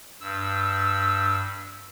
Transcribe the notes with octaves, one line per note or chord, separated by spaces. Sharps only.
G2 E6